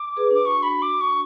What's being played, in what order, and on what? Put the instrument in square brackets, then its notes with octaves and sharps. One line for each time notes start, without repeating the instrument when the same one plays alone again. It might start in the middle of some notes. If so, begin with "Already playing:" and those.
Already playing: [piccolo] D6
[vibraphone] G#4 B4
[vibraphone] D4 [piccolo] D6
[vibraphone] D4 F#4 [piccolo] C#6
[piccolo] B5
D6
C#6